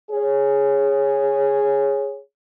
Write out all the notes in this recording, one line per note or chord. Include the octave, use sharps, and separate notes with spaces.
G#4 C#5